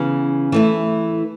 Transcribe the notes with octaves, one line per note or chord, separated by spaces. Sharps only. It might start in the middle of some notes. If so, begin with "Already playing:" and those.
Already playing: C#3 E3 B3
E3 A3 E4